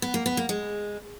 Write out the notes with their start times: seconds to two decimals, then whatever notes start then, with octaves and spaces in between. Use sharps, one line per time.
0.02 B3
0.14 A#3
0.26 B3
0.37 A#3
0.49 G#3